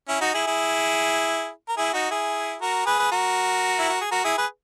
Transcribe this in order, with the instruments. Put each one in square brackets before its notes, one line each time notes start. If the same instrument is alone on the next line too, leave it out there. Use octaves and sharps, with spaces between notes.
[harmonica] C#4 E4
D#4 F#4
E4 G#4
E4 G#4
A#4
E4 G#4
D#4 F#4
E4 G#4
F#4 A#4
G#4 B4
B4
F#4 A#4
E4
F#4
G#4
F#4 A#4
E4 G#4
G#4 B4